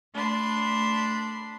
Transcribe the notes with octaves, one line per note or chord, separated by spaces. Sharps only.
A3 D4 B5 C6